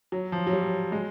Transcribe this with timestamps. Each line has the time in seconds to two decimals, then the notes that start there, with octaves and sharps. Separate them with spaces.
0.12 F#3
0.32 F3
0.47 F#3
0.53 G3
0.92 G#3